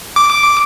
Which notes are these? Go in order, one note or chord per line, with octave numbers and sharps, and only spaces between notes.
D6